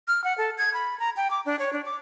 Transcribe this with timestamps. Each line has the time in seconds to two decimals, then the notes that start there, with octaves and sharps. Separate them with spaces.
0.08 F6
0.24 F#5
0.38 A4
0.58 G#6
0.74 B5
1.00 A#5
1.17 G5
1.31 D6
1.46 D4
1.59 C#5
1.73 D4
1.85 D6